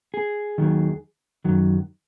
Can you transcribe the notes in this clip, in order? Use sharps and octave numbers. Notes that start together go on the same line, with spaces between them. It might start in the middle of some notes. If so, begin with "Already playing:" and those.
G#4
D#2 D#3 F#3
F#2 D#3 F#3